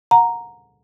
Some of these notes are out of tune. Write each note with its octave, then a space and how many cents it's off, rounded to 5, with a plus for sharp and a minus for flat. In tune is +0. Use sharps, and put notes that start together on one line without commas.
F#5 -30 A#5 +0